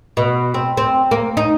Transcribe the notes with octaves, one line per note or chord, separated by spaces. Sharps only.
B2
C4
C4
A#3
D#4